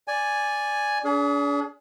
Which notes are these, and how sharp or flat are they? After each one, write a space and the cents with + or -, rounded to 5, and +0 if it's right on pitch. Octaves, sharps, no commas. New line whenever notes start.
D5 -5 G#5 +0
D4 -40 G#4 +25